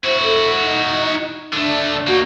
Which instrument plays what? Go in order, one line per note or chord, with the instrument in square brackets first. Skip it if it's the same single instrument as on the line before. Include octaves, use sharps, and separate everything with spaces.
[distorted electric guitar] E4 F#4 [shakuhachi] C5
[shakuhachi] A4
D#4
[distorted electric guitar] D3 A3 [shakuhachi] D4
[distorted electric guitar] A#3 D#4 [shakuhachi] F#4